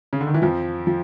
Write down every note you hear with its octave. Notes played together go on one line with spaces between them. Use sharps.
C#3
D3
D#3
E3
F2 F3
F3